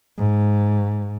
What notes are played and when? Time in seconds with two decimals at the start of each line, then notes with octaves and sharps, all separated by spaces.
0.18 G#2